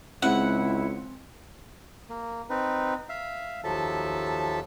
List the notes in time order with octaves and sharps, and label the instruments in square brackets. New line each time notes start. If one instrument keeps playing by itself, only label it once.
[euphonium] C#2 [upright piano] G#3 C4 [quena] E4 [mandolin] F#5
[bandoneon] A#3
C4 D#4 B4
E5 F5
D#2 F3 F#3 A4 E5 A5